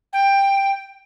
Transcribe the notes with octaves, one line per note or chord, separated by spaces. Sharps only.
G5